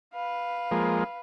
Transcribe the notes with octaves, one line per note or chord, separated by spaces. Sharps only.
B4 F5
F3 G#3 A#3